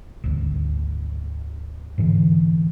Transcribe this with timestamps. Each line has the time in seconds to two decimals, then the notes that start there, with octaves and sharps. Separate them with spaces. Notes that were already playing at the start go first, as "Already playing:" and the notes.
0.24 G#1 D2
1.98 G#2 D3 E3